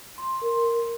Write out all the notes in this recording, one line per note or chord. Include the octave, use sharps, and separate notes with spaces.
C6
A#4